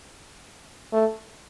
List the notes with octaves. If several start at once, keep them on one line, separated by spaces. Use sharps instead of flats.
A3